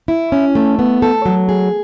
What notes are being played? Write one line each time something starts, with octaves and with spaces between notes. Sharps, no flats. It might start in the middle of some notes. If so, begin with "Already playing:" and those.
E4
C#4
A3
B3
A4
F#3
G#4